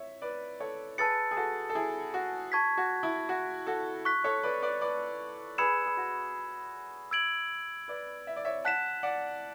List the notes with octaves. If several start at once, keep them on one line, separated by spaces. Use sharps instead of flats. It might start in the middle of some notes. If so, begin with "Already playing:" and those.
Already playing: C#5 E5
B4 D5
A4 C#5
G#4 B4 A5 E6 A6 C#7
G#4
F#4 A4
A4
E4 G#4
F#4
A5 C#6 G#6 B6
F#4
E4
F#4
F#4 A4
C#6 F#6 B6
A4 C#5
B4 D5
B4 D5
B4 D5
G#4 B4 B5 E6 G#6 C#7 E7
G#4
F#4
E6 G#6 D7 F#7
B4 D5
E5
D5
C#5 E5
F#5 A5 F#6 B6 E7
D5 F#5